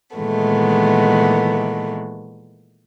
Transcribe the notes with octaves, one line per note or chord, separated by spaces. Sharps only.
A#2 D#3 E3 G#3 A3 B3